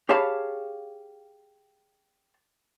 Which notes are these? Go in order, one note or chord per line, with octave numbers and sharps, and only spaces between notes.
G4 G#4 C#5 F5 A5 B5